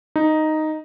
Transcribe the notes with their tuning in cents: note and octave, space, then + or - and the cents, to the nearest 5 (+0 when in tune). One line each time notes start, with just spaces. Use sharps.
D#4 +0